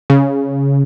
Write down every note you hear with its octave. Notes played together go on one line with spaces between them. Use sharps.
C#3